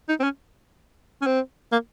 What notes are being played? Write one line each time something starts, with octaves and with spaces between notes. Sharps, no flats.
D#4
C4
C#4
C#4
C4
A#3